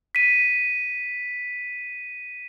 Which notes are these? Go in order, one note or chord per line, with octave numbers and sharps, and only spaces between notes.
B6 D#7